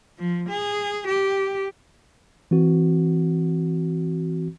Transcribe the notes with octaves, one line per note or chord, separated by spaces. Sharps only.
F3
G#4
G4
E3 C4 F#4